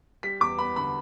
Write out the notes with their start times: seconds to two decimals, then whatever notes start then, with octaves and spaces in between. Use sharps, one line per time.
0.23 G3 B6
0.40 E2 D6
0.58 B3 B5
0.76 D3 B5